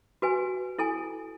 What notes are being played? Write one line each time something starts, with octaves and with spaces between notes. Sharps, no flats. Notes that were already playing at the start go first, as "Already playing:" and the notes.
F#4 B4 G#5
E4 A4 G#5